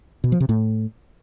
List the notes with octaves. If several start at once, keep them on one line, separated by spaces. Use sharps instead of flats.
B2
F3
C3
A2